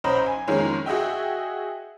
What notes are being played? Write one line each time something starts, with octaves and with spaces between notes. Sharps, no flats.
B1 C#4 C5 D#5 A#5 B5
G#5
F2 D#3 G#3 A#3 C#4
F#4 G#4 D#5 E5 G5